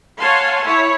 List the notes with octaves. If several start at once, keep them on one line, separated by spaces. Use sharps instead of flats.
C#5 F5 F#5 G#5 A5 C6
E4 C#5